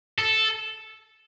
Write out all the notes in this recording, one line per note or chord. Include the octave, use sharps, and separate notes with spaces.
A4